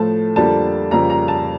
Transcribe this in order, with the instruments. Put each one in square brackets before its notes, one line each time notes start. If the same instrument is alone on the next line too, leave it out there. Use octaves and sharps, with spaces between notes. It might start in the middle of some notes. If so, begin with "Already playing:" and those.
Already playing: [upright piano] A2 F3 A3 A5
F2 D3 G3 A#3 A5
F2 C#3 G3 A#3 A#5
A#5
A5